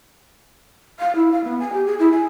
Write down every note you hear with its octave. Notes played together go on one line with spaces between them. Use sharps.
F5
E4
F5
B3
G#5
G4
G#4
E4
G#5